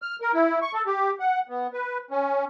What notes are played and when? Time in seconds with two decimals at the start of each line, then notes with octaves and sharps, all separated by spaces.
0.02 F6
0.21 A#4
0.34 E4
0.62 C#6
0.73 A4
0.86 G4
1.20 F#5
1.49 B3
1.73 B4
2.11 C#4